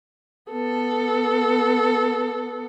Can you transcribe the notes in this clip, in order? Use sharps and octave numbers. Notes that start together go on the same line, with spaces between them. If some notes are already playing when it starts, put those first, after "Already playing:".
B3 A4